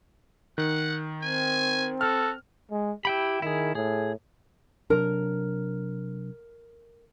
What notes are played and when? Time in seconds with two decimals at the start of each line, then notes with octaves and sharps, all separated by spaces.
0.58 D#3 F#5
1.22 C4 G#5
2.01 F#4 A4 F6
2.71 G#3
3.05 E4 G4 G5 B5
3.42 D#3 E4 G#4
3.75 A2 G#4
4.90 C3 F#3 D4 A#4